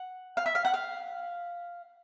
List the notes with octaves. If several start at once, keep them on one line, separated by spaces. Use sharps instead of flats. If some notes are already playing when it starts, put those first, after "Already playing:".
Already playing: F#5
F5
E5
F5
F#5
F5